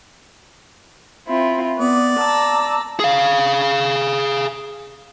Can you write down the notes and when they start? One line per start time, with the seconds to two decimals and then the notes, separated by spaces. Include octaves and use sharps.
1.27 C4 E4 F4
1.77 B3 D5
2.19 A5 A#5 E6
3.00 G#4 F5